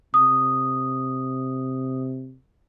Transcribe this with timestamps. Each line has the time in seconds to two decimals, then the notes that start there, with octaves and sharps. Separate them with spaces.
0.14 C3 D#6